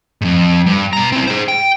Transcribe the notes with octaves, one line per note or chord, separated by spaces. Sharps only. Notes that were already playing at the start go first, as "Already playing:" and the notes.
F2 G#2
G2
B2 A#5
C4 E4
G#4 C5
G5